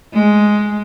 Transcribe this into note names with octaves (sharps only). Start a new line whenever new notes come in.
G#3